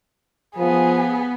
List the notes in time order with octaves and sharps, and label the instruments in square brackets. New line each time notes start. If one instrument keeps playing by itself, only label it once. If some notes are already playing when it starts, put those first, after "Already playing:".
[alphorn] F3 [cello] B3 [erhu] G#4